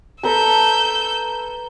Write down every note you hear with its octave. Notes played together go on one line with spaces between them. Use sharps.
A4 B4 A#5 E6 G6